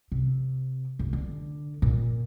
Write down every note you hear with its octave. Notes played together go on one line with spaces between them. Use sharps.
C3
F1
D3
A#2